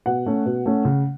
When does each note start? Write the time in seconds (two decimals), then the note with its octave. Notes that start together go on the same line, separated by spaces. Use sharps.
0.06 B2 F#5
0.26 A3 C#4
0.46 B2
0.66 A3 C#4
0.85 C#3